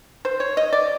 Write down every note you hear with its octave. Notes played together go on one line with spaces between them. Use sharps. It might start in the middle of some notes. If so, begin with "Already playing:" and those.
C5
C#5
D#5
D5